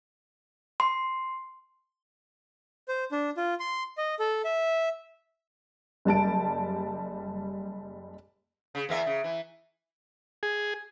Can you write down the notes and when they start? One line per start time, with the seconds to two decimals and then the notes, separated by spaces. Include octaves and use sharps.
0.80 C6
2.88 C5
3.12 D4
3.37 F4
3.60 C6
3.98 D#5
4.19 A4
4.45 E5
6.05 F#1 G3 A5 D7
8.75 C#3
8.89 E2 A#3 E5
9.06 C#3
9.24 E3
10.43 G#4